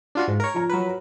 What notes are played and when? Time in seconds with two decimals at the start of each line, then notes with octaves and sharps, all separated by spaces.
0.15 D4 F4 F#4
0.28 G#2
0.40 A#4 C#5
0.54 F3 A#5
0.69 F#3 A#4 B4